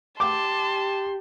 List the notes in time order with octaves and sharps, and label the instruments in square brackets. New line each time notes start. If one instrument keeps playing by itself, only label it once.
[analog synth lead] G4 [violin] A5 [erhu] C6 [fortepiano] D6